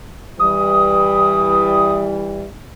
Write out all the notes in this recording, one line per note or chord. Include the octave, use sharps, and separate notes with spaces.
E3 G3 D#6